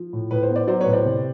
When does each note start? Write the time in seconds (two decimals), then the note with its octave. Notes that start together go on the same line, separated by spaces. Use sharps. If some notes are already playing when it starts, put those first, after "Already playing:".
Already playing: F3
0.13 A2
0.31 A2 B4
0.43 C5
0.49 B3
0.56 C5 D5
0.67 F#3 C5 D5
0.80 B4 C#5
0.86 A2
0.93 C5 D5
1.05 C3